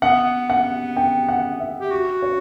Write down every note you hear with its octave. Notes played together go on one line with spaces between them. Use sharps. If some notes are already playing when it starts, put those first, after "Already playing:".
B3 F#5
F#5
G5
F#5
E5
G4
F#4
C#5